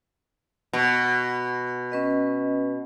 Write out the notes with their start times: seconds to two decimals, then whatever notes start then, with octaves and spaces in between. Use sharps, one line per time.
0.73 B2
1.92 C#4 B4 D#5